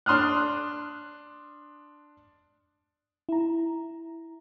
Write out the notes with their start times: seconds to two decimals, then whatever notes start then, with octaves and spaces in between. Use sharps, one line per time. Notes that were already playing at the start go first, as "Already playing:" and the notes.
0.06 D4 C6 D#6 F6 F#6
3.29 E4 A#5